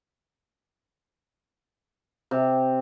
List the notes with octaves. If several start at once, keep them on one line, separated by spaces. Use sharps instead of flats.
C3